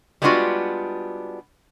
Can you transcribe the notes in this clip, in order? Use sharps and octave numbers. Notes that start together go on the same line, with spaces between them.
G3 G#3 B3 D4 F4 F#4